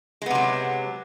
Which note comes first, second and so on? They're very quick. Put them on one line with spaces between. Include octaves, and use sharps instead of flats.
G#3 B3 C3 F#3